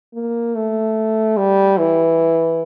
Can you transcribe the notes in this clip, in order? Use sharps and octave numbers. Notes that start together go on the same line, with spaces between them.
A#3
A3
G3
E3